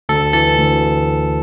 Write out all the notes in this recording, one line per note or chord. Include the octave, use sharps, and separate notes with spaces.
D2 A4
E3 A4
D2